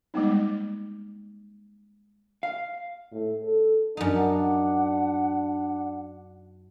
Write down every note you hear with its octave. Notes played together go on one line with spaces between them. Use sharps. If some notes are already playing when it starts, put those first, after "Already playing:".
G3 G#3 A#3 B3 D#4
F5
A2
A4
F#2 D4 D#4 F#5